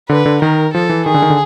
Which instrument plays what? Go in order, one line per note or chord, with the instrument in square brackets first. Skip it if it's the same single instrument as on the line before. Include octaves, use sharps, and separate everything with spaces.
[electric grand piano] D3 [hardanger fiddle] B4
[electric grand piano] D3
[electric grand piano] D#3 [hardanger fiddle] A#4
[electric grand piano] F3 [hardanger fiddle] A4
[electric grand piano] E3
[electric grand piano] D#3 [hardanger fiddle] G#4
[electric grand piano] D3
D#3
D3